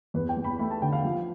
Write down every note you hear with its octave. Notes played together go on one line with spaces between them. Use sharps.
E2 B4
G5
E2
B5
A3 B5
A5
D3 G5
F5
F3